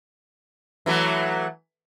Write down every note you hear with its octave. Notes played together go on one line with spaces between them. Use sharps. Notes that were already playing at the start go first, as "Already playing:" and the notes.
E3 F#3 A3